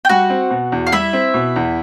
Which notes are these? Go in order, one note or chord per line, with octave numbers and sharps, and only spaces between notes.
G5
G3 F#4 F#5
C4
B2
E2
F5
G3 E4 E5
C4
B2
E2